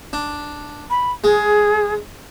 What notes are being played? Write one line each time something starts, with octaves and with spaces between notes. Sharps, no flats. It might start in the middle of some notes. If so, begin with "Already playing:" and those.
D4
B5
G#3 G#4